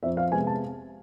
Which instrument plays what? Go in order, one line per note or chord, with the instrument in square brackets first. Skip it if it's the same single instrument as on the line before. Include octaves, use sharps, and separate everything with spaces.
[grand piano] F2 E5
F5
C3 G#3 B3 G#5
A5